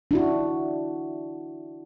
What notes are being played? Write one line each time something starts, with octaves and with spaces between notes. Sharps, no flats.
D4 E4 F#4